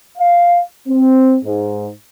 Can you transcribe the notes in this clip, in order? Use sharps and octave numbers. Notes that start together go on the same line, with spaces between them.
F5
C4
G#2